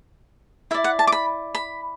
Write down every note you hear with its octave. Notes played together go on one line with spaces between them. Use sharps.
E4 D5 E5
F#5
A5
D6
B5
B5